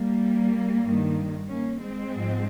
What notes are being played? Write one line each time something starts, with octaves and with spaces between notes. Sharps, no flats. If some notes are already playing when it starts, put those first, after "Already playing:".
Already playing: G3 A#3
G2 D#3
A#3 C#4
G#3 C4
G#2 F3